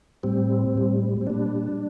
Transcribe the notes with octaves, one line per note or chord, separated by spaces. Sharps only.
A2 G3 C4
A2 G3
C4
A#2 G3 D4